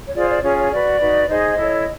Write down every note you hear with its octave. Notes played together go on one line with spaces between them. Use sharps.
C#5
F4 G#4 C5 D5
D5
C#4 F4 G#4 C#5
C#5
F#4 B4 D5
D#4 F#4 B4
D#4 G#4 C5 D#5
E4 A4 C#5